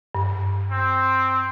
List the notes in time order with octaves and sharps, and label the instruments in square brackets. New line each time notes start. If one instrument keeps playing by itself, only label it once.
[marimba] G2
[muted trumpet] C4